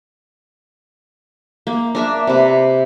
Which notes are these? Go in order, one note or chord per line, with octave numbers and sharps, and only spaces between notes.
A#3
D4 A#4 E5
C3 B4